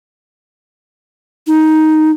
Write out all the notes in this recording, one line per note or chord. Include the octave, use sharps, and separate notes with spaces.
D#4